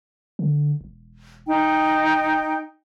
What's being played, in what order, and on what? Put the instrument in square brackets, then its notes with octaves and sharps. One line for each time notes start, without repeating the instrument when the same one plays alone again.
[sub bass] D3
E1
[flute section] D#4 G5